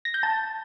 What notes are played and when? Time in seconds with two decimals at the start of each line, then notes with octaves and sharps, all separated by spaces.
0.05 A#6
0.14 G6
0.23 A5